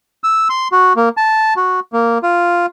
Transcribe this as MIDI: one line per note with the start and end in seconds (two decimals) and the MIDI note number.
0.24 0.48 88
0.50 0.68 84
0.72 0.93 66
0.96 1.09 58
1.17 1.54 81
1.56 1.80 66
1.93 2.18 58
2.23 2.66 65